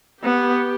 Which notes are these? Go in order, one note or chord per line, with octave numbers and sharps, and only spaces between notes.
B3 G4